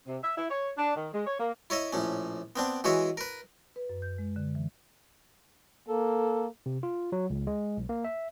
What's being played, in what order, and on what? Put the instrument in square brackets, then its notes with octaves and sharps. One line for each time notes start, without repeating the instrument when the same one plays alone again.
[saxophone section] C3
E5
E4
C#5
D4
D#3
G#3
C#5
A#3
[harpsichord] E4 C#5 D#5 E5
A#1 A2 C#4
B3 C4 D4
E3 G#3 F#4 C#5 E5
A#4 B4
[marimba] B4
F#2
G6
G#3
D3
E3
[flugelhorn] A#3 [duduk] A4
[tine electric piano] C3
F4
F#3
C#2
G#3
B1
A#3
E5